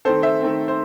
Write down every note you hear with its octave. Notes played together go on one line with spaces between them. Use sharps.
D#3 A3 C4 A4 C5
C5 E5
D#3 A3 C4
C5